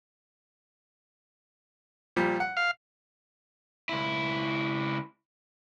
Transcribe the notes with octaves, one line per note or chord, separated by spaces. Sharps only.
A#2 F3 G3
F#5
F5
C#2 E4